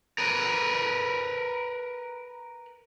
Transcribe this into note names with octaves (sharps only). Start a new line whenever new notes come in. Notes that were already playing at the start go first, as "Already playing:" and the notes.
A#4 B4